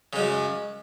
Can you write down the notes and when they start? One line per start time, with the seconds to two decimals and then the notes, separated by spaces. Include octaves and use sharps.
0.13 C#3
0.16 G#3
0.19 F#2